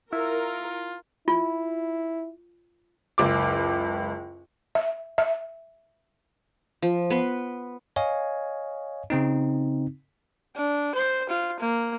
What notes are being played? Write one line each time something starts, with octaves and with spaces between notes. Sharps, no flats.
E4 F4 A#4
E4 F4
F#1 C#2 D6
E5
E5
F3
B3 B4 C6
C#5 D#5 F5 G#5
C#3 C4 D#4
D4
C5
F4
A#3